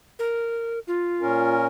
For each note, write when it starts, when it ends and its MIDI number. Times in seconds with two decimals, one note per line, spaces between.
0.19 0.79 70
0.87 1.55 65
1.21 1.67 46
1.21 1.67 61
1.21 1.67 70